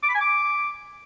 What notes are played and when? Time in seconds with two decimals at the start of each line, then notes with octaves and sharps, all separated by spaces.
0.03 D6
0.09 B5
0.15 G#5
0.21 D6